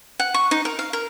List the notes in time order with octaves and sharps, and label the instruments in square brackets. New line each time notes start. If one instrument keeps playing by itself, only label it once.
[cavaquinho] F#5
C#6
D#4
A#4
F5
A#4